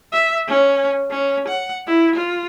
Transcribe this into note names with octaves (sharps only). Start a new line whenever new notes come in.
E5
C#4
C#4
F#5
E4
F4